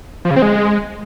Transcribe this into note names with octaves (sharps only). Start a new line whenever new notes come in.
F3
C#3
C4
G#3